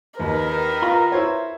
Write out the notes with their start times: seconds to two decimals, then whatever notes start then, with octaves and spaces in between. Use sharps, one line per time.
0.19 D#2 D#3 A#4 B4
0.82 F4 A#5
1.12 E4 C5 C#5